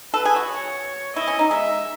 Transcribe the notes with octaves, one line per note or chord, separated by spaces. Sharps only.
A4 B4
G#4
F#4
C#5
E4 D#5
C#4
D#4
G#3 E5